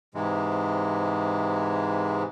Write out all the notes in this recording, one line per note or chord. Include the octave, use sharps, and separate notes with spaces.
G#2 C3 E3 G#3